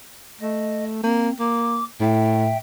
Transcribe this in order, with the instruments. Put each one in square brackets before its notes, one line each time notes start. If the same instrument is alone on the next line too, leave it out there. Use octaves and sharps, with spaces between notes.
[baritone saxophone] A3 [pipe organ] D#5
[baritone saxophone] A#3 [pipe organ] C4
[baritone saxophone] A#3 [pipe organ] D6
[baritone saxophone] A2 [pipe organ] E5 G5